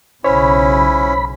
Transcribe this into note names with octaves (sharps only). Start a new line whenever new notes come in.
B1 C#3 C#4 E4 C5 C#5 B5